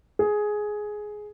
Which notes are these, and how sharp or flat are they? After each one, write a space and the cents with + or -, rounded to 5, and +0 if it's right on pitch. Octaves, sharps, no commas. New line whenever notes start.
G#4 +10